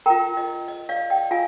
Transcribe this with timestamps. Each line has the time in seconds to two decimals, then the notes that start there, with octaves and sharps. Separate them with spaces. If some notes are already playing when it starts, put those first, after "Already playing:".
0.06 F4 A#4 G5 A#5
0.37 D#5
0.68 D#5
0.89 D5 F5
1.10 D#5 G5
1.31 F4 F5 G#5